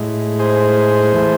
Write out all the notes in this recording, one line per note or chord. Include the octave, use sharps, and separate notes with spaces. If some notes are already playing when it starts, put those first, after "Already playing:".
Already playing: A2 G#3
G#4 C5
E3 A3